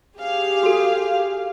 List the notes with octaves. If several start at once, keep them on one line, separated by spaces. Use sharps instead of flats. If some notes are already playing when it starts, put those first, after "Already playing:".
G4 G#4 F5
F#4 A4